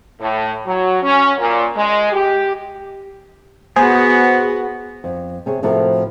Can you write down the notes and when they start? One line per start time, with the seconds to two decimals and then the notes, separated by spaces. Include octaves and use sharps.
0.21 A2
0.66 F#3
1.02 C#4
1.39 A#2
1.76 G#3
2.12 G4
3.76 B3 F#4 G#4 C5
5.04 F2
5.46 C3 G#4 C#5
5.63 A2 C3 F3 F#4 A4 A#4